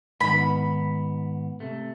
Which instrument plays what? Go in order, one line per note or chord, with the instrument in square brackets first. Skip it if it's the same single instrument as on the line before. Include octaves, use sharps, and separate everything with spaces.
[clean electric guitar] G#2 D#3 B3 [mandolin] B5
[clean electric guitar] C3 A3